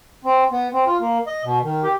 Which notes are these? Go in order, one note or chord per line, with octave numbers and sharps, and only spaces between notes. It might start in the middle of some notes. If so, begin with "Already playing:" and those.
C4
B3
C4
F4
A#3
D#5
B2
D#3
G4